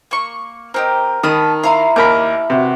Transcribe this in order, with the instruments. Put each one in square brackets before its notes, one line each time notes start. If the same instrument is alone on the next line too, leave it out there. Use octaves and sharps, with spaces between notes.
[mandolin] A#3 C#6
[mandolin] C4 G4 D#5 [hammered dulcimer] A#4
[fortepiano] D#3 [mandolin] A5 B5 D#6
[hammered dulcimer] E4 [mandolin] F5 A#5 C6
[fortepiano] D#2 A#4 B5 [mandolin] D6
[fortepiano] C3 [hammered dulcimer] E3 F#4